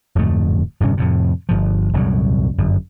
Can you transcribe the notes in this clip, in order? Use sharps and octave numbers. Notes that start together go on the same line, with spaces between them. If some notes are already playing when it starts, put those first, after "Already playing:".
D1 F2 G#2 A3
D1 G2 C3 C#4
F2 A2 C3
G1 C#2 F3
D#1 C2 F#2 F#3
G1 F#2